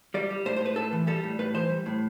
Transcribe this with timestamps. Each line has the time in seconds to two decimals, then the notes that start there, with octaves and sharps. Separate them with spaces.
0.14 G3 D5
0.30 G3
0.45 A2 C5
0.56 C5
0.61 A2 B4
0.76 A2 A4
0.93 E3
1.07 G3 A4
1.23 A2
1.39 A2 B4
1.54 E3 C5
1.69 G3
1.86 A2